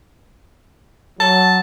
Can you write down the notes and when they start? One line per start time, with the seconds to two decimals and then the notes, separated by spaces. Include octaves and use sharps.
1.20 F#3 A5